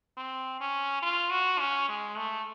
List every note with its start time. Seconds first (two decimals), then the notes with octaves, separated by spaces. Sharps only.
0.17 C4
0.60 C#4
1.02 F4
1.31 F#4
1.60 C#4
1.89 G#3
2.17 A3